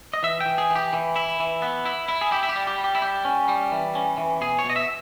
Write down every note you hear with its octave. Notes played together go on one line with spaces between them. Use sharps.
D#5
E3 E5
G5
E3
G#4
E3
G4
E3
E4
E3
B3
E4
E4
G#4
E4 G4
E4
G4
G3
G4
G3
G4
E4
G3 G4
C#4
G3
E3
C#4
E3
B2 G#4
C#5
B2
D#5
E5